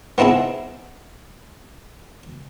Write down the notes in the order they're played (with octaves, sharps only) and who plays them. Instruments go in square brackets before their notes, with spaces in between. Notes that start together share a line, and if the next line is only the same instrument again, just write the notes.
[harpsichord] B3 C4 D#4 E4 G#4